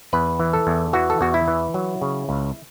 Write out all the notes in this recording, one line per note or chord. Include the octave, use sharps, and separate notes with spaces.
E2 B4
E3
A4
E2
E3 F#4
A4
E2 F#4
E4
E3
F#3
C#3
C#2